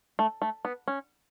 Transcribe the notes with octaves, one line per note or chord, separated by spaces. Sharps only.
A3
A3
B3
C#4